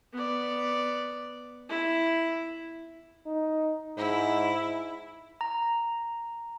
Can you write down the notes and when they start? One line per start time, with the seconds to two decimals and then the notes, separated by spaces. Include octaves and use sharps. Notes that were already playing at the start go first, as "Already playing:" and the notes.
0.13 B3 D5
1.69 E4
3.26 D#4
3.97 G#2 E4
5.41 A#5